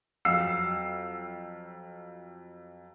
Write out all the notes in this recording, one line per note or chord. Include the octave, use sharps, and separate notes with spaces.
F2 F#3 F5 E6 C7